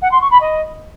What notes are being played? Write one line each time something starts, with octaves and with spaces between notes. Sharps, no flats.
F#5
C6
C#6
B5
D#5